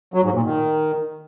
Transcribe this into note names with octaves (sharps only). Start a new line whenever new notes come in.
F#3
G#2
A#2
D#3